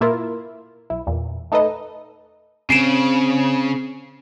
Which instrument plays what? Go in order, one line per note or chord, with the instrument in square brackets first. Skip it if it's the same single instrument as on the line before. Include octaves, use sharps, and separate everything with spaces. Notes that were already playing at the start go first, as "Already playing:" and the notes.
[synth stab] A#2 A#3 E4 F4 A#4
B1 E4
E2 A#2
A3 D#4 A4 B4 D#5
[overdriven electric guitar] C#3 [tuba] C4 [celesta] C7 D7 E7